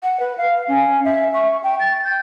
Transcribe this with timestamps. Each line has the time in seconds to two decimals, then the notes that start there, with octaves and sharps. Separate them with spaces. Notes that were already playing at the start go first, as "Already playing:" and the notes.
0.03 F#5
0.20 B4
0.38 F5
0.68 C#4
1.05 E5
1.34 C#6
1.63 G5
1.80 A6
2.04 G6